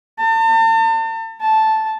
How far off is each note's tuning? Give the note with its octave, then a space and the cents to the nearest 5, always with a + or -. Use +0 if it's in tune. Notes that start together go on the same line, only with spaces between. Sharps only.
A5 +40
A5 -5